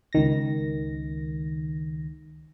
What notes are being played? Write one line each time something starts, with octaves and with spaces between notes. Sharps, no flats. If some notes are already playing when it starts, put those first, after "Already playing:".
C#2 D#3 A#6